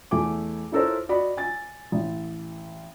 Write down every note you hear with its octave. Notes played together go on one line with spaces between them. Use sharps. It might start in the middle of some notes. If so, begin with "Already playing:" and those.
E2 A3 G#5 D6
E4 F4 A4 A#4 C5 C#5
F#4 D5 D#5 B5
G#5 A6
A1